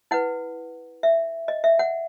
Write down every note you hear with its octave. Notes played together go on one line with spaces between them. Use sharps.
E4 B4 F#5
E5
D#5
E5
F#5